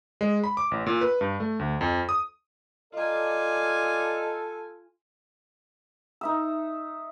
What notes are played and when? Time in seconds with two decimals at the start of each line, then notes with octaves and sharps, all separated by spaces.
0.21 G#3
0.44 B5
0.57 D6
0.71 A1
0.86 A#2
1.01 B4
1.21 G2
1.40 A3
1.59 D2
1.81 F2
2.09 D#6
2.94 F4 A4 D5 D#5 G#5 A#5
6.21 D#4 E5 E6